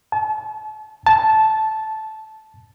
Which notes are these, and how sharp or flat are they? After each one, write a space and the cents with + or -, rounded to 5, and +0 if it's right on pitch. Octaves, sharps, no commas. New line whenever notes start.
A5 -35
A5 -10